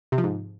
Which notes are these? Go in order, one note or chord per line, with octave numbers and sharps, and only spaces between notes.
C3
F3
G#2